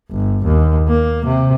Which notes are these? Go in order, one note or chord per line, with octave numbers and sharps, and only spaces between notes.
G1
D#2
A#3
C3